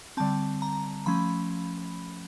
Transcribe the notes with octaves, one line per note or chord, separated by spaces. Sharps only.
D3 G3 C4 A5
A#5
F3 A3 C#4 B5